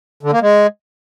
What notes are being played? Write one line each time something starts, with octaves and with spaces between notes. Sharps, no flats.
D3
A#3
G#3